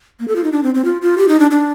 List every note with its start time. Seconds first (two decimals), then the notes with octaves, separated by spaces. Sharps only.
0.20 A#3
0.28 A4
0.36 F4
0.44 D#4
0.52 D4
0.63 C4
0.75 C4
0.85 F4
1.02 F4
1.18 G4
1.28 D#4
1.40 D4
1.51 D4